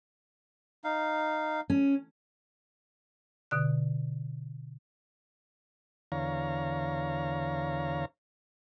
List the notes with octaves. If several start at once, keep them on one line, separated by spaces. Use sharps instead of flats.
D#4 F5
C#4
B2 D3 F#6
E2 D3 C#5 F5 A#5